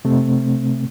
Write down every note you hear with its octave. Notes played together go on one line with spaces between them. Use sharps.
C3 A3 C4